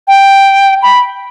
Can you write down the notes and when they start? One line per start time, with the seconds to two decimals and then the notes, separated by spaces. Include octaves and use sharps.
0.08 G5
0.83 B5